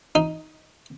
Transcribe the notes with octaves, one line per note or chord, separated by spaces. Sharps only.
D#4